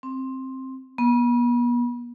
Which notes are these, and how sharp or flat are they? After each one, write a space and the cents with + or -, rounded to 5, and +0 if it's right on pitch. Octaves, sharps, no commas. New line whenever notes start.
C4 +10
B3 -40